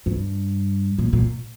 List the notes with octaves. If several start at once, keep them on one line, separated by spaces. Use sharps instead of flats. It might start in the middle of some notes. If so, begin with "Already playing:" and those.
G2
A#2
A#2